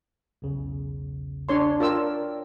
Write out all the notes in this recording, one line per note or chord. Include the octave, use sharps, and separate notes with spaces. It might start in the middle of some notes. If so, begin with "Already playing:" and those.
B1 E2 C#3
D4 C#5 C6
F4 A#4 C#5 D5 G5 E6